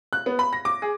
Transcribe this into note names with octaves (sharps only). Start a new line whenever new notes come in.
F#6
B3
B5
A#6
D6
G#4